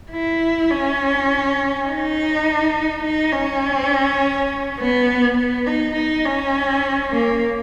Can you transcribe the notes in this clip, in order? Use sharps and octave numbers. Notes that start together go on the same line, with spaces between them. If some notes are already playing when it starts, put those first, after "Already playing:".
E4
C#4
D#4
D#4
C#4
B3
B3
D#4
D#4
C#4
A#3